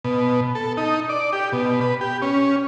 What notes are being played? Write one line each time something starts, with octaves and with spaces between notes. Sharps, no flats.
B2
A4
D#4
D5
G4
B2
B4
G4
C#4